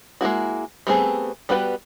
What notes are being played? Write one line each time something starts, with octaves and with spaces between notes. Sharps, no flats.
G#3 A#3 E4 F#4
G3 A3 B3 C4 G#4
G3 B3 F#4 B4 G5